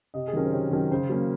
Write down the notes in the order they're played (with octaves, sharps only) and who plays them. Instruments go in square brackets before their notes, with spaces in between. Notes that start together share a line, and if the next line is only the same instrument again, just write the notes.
[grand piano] C3 D#5
G#4
D#3 F#3 C#4 A#4
C5
C3 C#5
D#3 F#3 C#4
C#3 C5
F#3 A#3 C#4